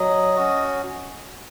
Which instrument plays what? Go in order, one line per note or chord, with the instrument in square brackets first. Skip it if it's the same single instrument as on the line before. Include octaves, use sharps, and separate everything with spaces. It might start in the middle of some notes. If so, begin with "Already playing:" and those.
Already playing: [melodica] F#3 D#5
C#4 F#4